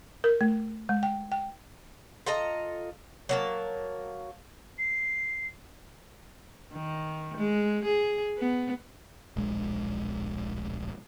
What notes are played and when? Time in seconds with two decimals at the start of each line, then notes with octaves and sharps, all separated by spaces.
0.24 A#4
0.41 A3
0.89 G#3
1.03 G5
1.32 G5
2.26 F4 A4 D#5 A#5
3.29 F#3 A#3 A5
4.78 C7
6.73 D#3
7.37 G#3
7.85 G#4
8.38 B3
9.36 D1 A#1 G#3